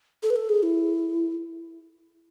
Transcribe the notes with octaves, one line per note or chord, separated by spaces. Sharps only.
A4
B4
A4
G#4
E4